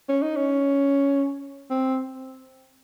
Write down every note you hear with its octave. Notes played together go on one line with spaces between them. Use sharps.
C#4
D#4
C#4
C4